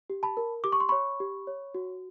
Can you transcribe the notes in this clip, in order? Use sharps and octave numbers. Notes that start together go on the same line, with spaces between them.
G4
A5 B5
A#4
G4 D6
C#6
C6
C#5 B5 C#6
G4
C#5
F#4